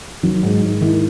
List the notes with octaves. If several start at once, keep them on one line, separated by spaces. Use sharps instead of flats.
D#3 F#3
G#2
G#2
D#3 E4